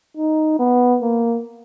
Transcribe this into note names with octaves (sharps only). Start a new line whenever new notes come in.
D#4
B3
A#3